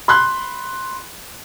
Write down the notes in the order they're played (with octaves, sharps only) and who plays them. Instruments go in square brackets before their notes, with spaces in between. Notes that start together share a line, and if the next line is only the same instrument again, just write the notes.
[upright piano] B5 C6 F#6